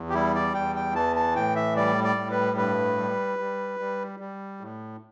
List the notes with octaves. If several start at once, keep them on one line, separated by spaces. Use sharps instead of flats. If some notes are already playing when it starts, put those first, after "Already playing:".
Already playing: E2
G4
G3 E4
D5
E2 G5
G5
E3 A5
A5
A2 G5
E5
G3 D5
D5
A2
B4
G2 B4
G3
G3
G3
G3
A2